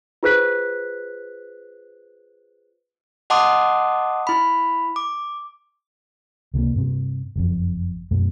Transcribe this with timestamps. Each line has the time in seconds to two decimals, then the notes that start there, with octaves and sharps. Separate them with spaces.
0.23 F4 G#4 B4 C5 F#6 B6
3.30 D#5 F#5 A5 C6 D6 D#6
4.27 E4 B5
4.96 D6
6.54 C#2 C3 D#3 A#3
6.75 G2 C3 C4
7.36 F#1 F2
8.11 F#2 B2 A3